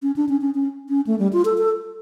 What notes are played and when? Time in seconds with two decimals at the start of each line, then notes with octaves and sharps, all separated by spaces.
0.02 C#4
0.16 D4
0.29 C#4
0.41 C#4
0.55 C#4
0.89 C#4
1.07 A3
1.19 G3
1.33 F4
1.45 A4
1.58 A4